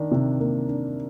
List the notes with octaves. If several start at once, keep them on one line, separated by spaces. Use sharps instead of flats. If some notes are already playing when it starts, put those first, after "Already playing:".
Already playing: D#3 D4
C3
A#3
D4